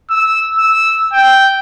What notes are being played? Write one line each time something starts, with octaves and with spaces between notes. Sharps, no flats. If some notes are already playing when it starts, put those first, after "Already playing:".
E6
E6
G5